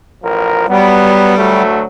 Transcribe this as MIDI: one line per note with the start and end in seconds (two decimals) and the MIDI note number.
0.23 0.66 33
0.23 0.66 53
0.23 0.66 70
0.69 1.34 54
0.69 1.63 55
0.69 1.34 59
1.37 1.83 38
1.37 1.83 54
1.37 1.83 57